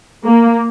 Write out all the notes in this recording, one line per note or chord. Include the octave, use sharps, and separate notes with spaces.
A#3